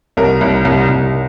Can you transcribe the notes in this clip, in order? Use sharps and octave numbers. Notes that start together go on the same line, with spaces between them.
C2 A#4
C2
C2
C2